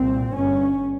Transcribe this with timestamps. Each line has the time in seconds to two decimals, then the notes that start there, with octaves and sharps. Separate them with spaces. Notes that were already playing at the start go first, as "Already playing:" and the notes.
Already playing: C2 A#2 C4
0.34 G1 G2 C#4